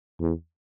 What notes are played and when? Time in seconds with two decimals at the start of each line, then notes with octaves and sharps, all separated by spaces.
0.20 E2